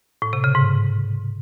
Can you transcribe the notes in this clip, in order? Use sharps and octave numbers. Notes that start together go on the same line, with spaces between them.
A2
C3
C#3
G#2